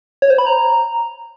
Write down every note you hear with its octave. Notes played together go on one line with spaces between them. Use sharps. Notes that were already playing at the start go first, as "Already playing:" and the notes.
C#5
C5
B5
A#5